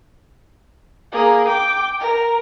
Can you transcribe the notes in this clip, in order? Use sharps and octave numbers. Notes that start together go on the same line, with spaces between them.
A#3 G#4
G5 D6
A#4